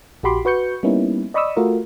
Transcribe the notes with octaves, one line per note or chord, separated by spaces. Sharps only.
A#1 F#4 G4 B5 C6 D6
F#4 B4 C#6 G6 C#7
G3 A#3 B3 C#4 D#4 E4
D5 D#5 B5 C#6 D#6 E6
A3 F4 F#4 A#4